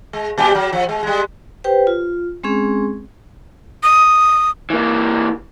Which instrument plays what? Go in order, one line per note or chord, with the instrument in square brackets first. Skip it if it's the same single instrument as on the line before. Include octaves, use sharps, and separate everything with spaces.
[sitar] G#3
A#2 G3 G4
F#3
F3
G#3
G3 G#3
[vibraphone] G4 B4 C5 G5
F4
G#3 C4 C#4 G#4
[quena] D#6
[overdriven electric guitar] E3 A#3